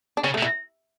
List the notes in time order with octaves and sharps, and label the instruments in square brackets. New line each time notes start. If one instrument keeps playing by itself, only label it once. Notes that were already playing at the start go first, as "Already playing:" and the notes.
[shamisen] D4
[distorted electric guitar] C#3 [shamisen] C#4
[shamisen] A3
[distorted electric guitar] B2
[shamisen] E4